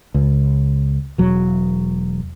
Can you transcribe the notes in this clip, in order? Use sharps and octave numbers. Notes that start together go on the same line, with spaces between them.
C#2
E1 F#3